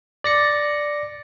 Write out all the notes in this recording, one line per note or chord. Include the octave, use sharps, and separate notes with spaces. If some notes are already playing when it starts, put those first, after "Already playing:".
D5 A#6 C#7